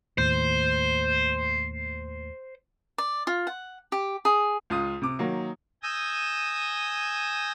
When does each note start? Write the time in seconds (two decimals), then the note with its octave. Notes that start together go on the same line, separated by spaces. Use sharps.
0.18 D#2 A2 C5
2.98 D5
3.27 F4
3.47 F#5
3.92 G4
4.25 G#4
4.70 C#2 F4 D#6
5.02 C3 D6
5.19 D#3 F#3 A#3
5.83 G#5 D#6 E6 G6 A#6